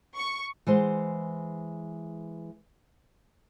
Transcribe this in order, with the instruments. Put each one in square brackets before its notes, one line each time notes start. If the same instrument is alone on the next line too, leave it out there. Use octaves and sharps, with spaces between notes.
[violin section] C#6
[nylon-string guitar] E3 G#3 C5 F#5